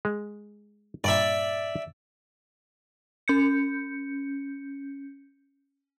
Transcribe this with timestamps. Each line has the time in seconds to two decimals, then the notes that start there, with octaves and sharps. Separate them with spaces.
0.05 G#3
1.04 G2 A#2 D5 E5
3.28 C#4 G6 C#7